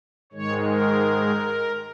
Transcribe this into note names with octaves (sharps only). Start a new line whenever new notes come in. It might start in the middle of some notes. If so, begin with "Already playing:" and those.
G#2 D#3 G#3 C#5
A#4